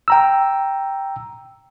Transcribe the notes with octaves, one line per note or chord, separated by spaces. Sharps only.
G5 A#5 E6